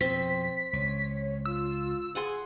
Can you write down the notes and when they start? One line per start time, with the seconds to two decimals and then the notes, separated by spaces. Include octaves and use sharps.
0.01 F2 B2 C4 B6
0.73 C#2 C#5
1.45 F4 E6
2.15 G#4 F#5 G#5 C6